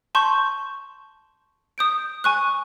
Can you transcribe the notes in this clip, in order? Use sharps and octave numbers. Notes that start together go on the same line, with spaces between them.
A5 C6 C#6 G6
D#6 G6 D7
G#5 C#6 F#6